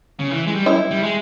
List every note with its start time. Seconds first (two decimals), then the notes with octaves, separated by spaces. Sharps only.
0.20 C#3
0.30 E3
0.47 G#3
0.55 G3
0.66 E4
0.91 G3
1.03 G#3